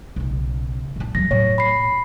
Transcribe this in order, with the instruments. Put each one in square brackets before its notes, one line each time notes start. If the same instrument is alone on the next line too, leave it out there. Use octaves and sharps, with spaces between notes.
[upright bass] B1 C#3
A#2 D4
[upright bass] E2 F#3 [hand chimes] A#6
[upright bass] A2 [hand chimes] C#5
[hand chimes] B5 C7